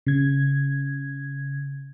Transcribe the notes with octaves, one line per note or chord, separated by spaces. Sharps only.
C#3 G#6